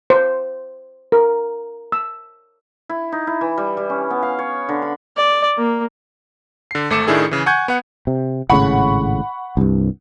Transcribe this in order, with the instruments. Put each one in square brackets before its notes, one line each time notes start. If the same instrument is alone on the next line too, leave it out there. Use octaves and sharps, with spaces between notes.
[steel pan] C5
A#4
E6
[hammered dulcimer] E4
D#4
E4
E3
G3
G3
C#4
B3
F5
C#5
D3
B5
[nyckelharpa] D5
A#3
[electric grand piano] D3 C7
G#1 A3 D6 C#7 E7
A2 D#3 D4 E4 G#4 A4
C#3 E3
F#5 G#5 C#6 G6 G#6
B3 F#5
[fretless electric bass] C3
[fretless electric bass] G#1 A2 C#3 [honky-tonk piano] F#5 B5 C#6
[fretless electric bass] C2 G2